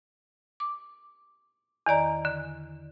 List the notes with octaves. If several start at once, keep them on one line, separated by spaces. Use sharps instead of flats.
D6
E2 D#3 D5 A#5
D3